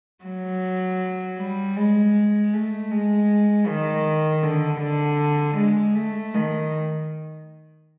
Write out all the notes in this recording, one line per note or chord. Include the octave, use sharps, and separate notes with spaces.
F#3
G3
G#3
A3
G#3
D#3
D3
D3
G#3
A3
D#3